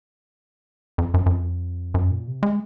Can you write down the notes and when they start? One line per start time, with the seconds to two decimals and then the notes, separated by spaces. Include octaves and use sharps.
0.98 F2
1.14 F#2
1.26 F#2
1.30 F2
1.94 F#2
2.11 A#2
2.28 C3
2.43 G#3